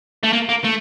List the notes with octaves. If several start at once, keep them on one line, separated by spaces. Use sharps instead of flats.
A3
A#3
A#3
A3